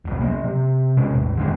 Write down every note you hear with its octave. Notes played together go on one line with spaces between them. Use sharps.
E1 C2
F#3 A#3
C3
C3 G#3 C#4
A1 E2
D3 D#3 G#3